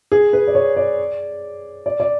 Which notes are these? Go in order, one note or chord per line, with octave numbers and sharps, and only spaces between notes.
G#4
B4
D5
C#5
D5
D5
D5